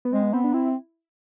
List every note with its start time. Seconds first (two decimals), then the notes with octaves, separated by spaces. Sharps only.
0.05 B3
0.13 G#3 C4
0.23 B3
0.33 B3 C4
0.44 D4
0.53 C4 E4